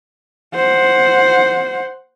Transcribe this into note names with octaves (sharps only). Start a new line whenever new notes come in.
C5 F#5